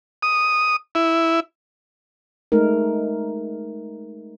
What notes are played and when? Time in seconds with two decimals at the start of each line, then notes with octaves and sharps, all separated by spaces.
0.23 D#6
0.95 E4
2.52 G#3 A3 D#4 A#4